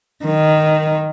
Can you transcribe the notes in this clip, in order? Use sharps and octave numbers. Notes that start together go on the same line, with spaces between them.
D#3